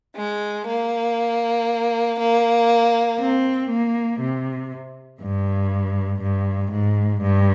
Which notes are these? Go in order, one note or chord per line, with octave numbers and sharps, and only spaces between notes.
G#3
A#3
A#3
C4
A#3
C3
G2
G2
G#2
G2